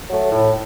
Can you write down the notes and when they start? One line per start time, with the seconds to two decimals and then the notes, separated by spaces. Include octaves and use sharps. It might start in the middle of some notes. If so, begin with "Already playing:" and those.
0.09 F#3 A3
0.32 A2